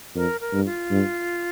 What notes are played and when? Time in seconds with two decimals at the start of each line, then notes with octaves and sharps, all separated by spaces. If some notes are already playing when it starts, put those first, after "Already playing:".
0.15 F2 A#4
0.41 A#4
0.53 G2
0.65 F4
0.91 G2